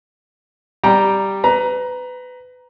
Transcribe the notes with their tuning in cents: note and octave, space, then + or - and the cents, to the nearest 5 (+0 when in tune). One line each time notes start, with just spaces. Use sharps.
G3 +0 G5 +0 A#5 +0
B4 +25 A#5 +15